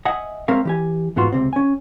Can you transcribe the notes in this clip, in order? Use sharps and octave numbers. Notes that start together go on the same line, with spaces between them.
D#5 E5 F#5 G#5
G#3 C4 A#4 C#5 E5 F5
E3 G4 G#5
E2 G#2 B3 F4 F#4 C6
C#2 C3 C4
C#4 G#5